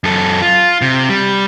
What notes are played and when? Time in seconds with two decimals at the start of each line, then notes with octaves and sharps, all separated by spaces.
0.04 F#2 A4
0.42 F4
0.82 C3
1.09 G3